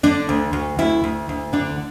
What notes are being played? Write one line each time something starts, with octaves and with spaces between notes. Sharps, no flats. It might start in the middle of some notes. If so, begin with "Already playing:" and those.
D3 D4
D2
D2
D2 E4
D2
D2
D3 D4